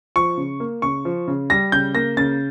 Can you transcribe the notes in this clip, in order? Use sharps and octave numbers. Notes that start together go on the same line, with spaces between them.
F3 C#6
C#3
A#3
C#3 C#6
F3
C#3
G3 A#6
C#3 G6
A#3 A#6
C#3 A6